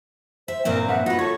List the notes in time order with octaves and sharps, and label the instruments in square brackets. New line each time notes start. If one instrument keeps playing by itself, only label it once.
[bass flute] C5 [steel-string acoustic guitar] E5
[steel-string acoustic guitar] G2 A#2 C4 [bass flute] A#3 [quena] A#4
[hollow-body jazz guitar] F2 E5 [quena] F#5
[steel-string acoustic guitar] B3 B4 [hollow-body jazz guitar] D#4 [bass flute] F4 [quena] F#4
[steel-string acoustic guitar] F#4 [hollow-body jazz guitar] A4 C#5 [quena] C#6